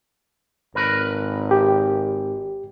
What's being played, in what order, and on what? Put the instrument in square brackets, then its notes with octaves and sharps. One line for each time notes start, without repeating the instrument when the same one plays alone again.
[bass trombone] G#1 [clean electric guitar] A#4 B4
[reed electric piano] G4